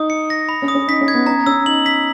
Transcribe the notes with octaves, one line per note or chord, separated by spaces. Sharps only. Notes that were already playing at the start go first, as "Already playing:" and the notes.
Already playing: D#4 D#6
C#7
A#6
B5
C#4
D#6
C#4
D#4 B6
C#4
G#6
B3
C#4 A#5
C#4 E6
D#4 F#7
B6